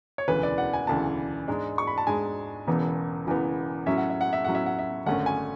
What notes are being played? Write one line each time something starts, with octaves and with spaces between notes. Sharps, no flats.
C#5
E1 D2 C#3 E3 B4
D5
F#5
G#5
E1 D2 C#3 E3 A5
G#2 G#3 D4
C#6
B5
A5
G#2 G#3 D4 G#5
E1 E2 C#3 E3 B3
E1 E2 C#3 E3 B3
A2 F#3 C#4 E5
F#5
E5
F#5
E5
A2 F#3 C#4 F#5
E5
F#5
E5
G#1 F#2 D3 A3 C#4 F#5
G#5